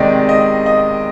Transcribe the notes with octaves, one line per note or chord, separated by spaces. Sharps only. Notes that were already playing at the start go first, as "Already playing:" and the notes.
Already playing: C3 D#3 G#3 D5
D#5
D#5